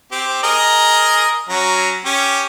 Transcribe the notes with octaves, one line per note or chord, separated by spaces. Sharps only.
C4 G4
G#4 A#4 D#5
F#3 C#4 A#5
C#4 G4